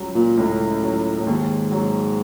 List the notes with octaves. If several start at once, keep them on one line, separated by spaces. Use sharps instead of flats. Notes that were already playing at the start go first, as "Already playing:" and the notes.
Already playing: C#2 F#3
A#2
C#2 A2
F#3
A2
D#2 G#2
F#3